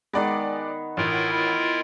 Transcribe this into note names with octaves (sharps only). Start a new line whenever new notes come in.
D#3 G#3 B3 D5
A1 E4 F4 A#4